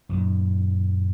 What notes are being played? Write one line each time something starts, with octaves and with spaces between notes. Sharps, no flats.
F#2 A#2 D#3